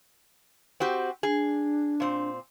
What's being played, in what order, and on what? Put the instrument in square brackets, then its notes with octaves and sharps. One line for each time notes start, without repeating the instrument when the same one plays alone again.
[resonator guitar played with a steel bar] C4 F#4 G4
[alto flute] D4 [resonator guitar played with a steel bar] G#4
[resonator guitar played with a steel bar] A#2 C4